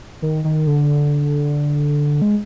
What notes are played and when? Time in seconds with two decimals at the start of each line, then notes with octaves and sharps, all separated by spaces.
0.22 D#3
0.44 D#3
0.67 D3
2.22 G#3